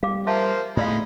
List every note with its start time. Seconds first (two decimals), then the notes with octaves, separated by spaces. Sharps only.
0.03 G3 F5 D6
0.27 F3 A#3 C5 E5 F5 A5
0.77 A2 G#3 A3 D#4 E4 D5 F5 B5